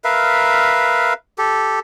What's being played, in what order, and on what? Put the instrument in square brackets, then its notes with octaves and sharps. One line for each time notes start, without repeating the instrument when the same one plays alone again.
[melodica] A#4 B4 E5 F5
G4 A4